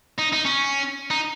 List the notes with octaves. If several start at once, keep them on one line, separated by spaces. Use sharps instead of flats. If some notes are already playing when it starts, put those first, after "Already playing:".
D#4
D#4
C#4
D#4